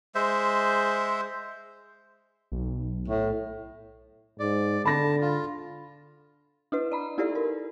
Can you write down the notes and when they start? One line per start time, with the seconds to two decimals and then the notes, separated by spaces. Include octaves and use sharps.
0.15 G#3 C5 E5
2.52 B1
3.08 A2
4.39 G#2 D5
4.85 D3 A5 B5 A#6
5.21 F4
6.72 D4 E4 B4
6.92 D5 D#5 A#5 B5
7.18 D#4 E4 G4 A4 B4 D5
7.35 A#4